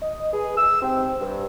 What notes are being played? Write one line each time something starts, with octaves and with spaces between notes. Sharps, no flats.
D#5
G#4 B4
E6
G#2 C3 C4 G5
G2